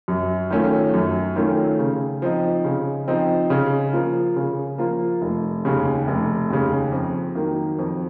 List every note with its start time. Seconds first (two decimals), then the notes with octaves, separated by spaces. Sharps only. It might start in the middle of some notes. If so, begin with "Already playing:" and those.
0.08 F#2
0.51 D#3 A3 C#4 F4
0.94 F#2
1.36 D#3 A3 C#4 F4
1.79 C#3
2.22 F3 C4 D#4
2.65 C#3
3.08 F3 C4 D#4
3.50 C#3
3.93 F3 A#3 F4
4.36 C#3
4.78 F3 A#3 F4
5.22 F1
5.65 D#2 C#3
6.07 F1
6.50 D#2 C#3
6.92 F2
7.35 D#3 F#3 A#3
7.79 F2